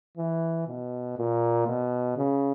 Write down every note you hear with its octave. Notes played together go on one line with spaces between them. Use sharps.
E3
B2
A#2
B2
C#3